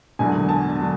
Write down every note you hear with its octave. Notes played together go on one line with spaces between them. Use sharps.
E1 E2 D3 F#3 G#5
A5
D3 F#3